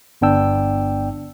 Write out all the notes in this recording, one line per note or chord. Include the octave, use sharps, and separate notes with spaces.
G1 B3 D4 G5 E6